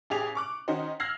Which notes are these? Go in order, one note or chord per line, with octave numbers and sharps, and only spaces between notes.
A1 G4 G#4 F7
C#6 D6 F#6
D#3 C#4 D#4 F#4 C5
E6 F6 G#6 A#6 C7 F#7